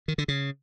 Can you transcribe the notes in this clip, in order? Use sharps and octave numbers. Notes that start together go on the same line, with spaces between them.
D#3
D3
C#3